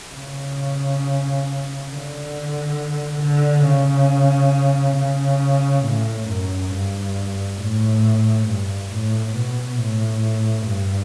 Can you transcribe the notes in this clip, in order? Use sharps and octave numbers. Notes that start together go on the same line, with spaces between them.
C#3
D3
D3
C#3
C#3
A2
F#2
G2
A2
G2
A2
B2
A2
G2